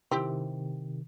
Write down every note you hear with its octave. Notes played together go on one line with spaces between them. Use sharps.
C3 D#3 C4 E4 G4